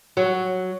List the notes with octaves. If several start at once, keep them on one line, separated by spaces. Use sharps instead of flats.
F#3